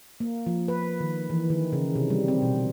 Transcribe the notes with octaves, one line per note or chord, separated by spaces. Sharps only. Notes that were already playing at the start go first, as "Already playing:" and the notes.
A#3
F3
B4
D#3
E3
D#3
C#3
C3
G3
C4
B2